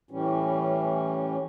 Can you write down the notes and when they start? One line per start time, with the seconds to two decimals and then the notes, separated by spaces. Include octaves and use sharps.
0.11 A2 E3 G3 C#4